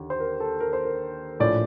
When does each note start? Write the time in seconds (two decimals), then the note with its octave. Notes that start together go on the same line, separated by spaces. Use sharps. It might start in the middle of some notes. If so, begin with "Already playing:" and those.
Already playing: D#2 D3
0.10 C5
0.20 A#4
0.40 A4
0.60 A#4
0.73 C5
0.85 A#4
1.40 A#1 A2 F3 D5